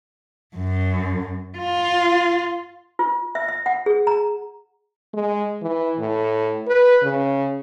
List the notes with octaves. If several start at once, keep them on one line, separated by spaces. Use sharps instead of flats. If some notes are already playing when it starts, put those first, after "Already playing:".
F#2
F4
F4
E5
E5
F#5
G#4
A#5
G#3
E3
A2
B4
C#3